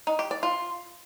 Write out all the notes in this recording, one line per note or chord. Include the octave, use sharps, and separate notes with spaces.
D#4
G4
D5
F4